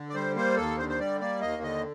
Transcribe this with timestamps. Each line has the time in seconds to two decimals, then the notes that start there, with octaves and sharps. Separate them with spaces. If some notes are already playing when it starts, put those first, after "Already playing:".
Already playing: D3
0.09 D5
0.15 G3 C5
0.36 A#3 C5
0.57 D#2 A4
0.78 D3 C5
0.89 C5
0.99 G3 D5
1.20 A#3 D5
1.41 D#2 D#5
1.63 D3 D#5